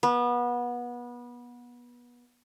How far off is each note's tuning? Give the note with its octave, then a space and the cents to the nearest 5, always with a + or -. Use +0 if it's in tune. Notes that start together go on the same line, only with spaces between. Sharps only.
B3 -25